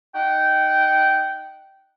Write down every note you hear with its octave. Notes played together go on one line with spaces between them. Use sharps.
D#4 F#5 G5